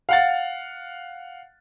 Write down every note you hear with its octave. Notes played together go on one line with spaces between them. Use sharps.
F5 F#5 A6